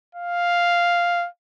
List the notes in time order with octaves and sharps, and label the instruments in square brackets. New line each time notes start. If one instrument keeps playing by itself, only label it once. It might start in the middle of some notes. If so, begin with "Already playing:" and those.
[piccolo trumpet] F5